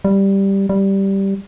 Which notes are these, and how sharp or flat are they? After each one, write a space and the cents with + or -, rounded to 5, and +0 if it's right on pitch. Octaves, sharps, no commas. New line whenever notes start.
G3 +0
G3 -5